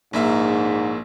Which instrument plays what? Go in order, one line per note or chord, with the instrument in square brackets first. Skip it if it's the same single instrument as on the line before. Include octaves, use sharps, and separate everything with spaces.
[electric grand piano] A#1 A#3 E5 [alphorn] G#2